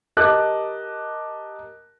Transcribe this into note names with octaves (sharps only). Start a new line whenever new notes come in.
G4 A#4 D#5 A5 D6 F#6